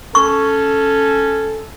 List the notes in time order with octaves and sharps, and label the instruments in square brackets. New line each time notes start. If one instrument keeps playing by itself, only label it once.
[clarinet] C#4 [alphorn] A4 [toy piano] C#6